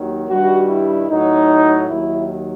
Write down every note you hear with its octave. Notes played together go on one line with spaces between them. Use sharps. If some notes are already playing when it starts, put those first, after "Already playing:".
Already playing: D#2 D#3 F#3
G2 D#3 G3 F#4
E4
A2 F#3 D#4
D#2 D#3 F#3 E4